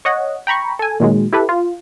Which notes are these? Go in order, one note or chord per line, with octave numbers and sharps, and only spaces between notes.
C#5 D#5 F#5
G5 A#5 B5 C#6
A4 G#5
A#2 D#3 F#3 G#3
E4 G4 A4 B4
F4